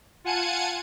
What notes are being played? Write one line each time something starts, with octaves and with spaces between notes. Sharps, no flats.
F4 F#5 G#5 A5 C#7 D#7